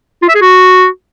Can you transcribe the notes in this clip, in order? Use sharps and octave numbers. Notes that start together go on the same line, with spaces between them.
F4
E5
G#4
F#4